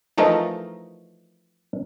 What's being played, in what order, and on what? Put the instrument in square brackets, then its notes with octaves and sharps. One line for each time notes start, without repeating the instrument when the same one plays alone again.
[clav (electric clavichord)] E3 F3 A3 D#4 A#4 D#5